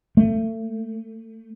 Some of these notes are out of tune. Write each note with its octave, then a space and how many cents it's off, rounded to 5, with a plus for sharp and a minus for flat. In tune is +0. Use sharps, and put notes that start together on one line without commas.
A3 +30